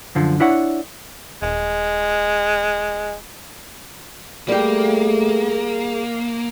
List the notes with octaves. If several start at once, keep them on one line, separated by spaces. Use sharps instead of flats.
F#2 D3 F3
D4 E4 C#5 F#5
D#1 G#3
G3 A3 A#3 G4 G#4